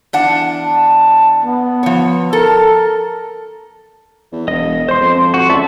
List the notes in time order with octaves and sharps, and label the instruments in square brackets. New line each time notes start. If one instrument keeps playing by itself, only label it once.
[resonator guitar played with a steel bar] E2 D4 F#5
[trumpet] A5
B3
[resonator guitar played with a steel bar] F3 C#5
[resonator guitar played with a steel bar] A4 [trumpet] A#4
[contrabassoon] E2
[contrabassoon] E1 [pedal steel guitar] D#5
[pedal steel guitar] C5 C6
[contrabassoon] F2
[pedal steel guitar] F#4
[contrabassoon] C#2 [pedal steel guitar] D5 E5 A5